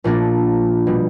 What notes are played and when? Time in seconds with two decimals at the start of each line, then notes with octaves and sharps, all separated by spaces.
0.04 A#1 A#2 A#3 D4
0.87 B2 G3